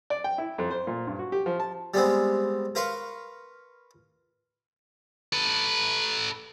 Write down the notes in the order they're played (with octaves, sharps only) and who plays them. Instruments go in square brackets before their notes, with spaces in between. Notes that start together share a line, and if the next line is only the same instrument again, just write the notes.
[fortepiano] D5
G5
E4
F2
C5
A#2
G2
F#4
G4
F3
A5
[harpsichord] G3 G#3 B3 C4
A#4 B4 F5 C6 C#6
[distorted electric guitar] A4 B4